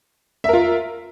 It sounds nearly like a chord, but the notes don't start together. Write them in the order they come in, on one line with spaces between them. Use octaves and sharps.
E5 A#4 F4